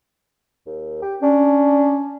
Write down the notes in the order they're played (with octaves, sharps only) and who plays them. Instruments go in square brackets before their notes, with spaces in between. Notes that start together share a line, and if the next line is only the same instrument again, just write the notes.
[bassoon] D#2
G4
[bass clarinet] C#4 [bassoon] D4